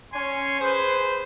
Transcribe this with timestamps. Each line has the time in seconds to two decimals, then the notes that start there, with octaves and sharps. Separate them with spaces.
0.13 C#4 C#5 G#5 C6
0.60 G#4 B4 C5